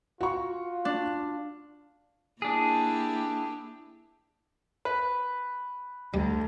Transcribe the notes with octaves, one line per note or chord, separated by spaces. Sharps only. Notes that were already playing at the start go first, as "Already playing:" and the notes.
F4 F#4 C#6
D4
A#3 D4 E4 G4 G#4
B4 B5
D2 G3